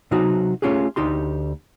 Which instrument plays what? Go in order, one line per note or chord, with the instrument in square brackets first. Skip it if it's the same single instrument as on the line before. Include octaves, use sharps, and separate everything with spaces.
[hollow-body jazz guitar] C3 F#3 D#4 F#4
A3 C#4 F4 G4 G#4
D2 D#4 G4 C6